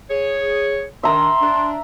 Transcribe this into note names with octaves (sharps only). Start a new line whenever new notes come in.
G#4 C#5
D#3 D4 E5 A#5 C6
D4